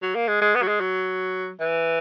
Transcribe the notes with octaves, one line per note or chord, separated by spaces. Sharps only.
F#3
A#3
G#3
G#3
B3
F#3
G#3
F#3
E3